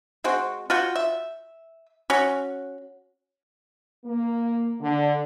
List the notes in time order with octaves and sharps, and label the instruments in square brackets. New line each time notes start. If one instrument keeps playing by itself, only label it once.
[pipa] G#3 C4 F#4
F4 F#4 G5
E5
C#4 F#4
[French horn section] A#3
D3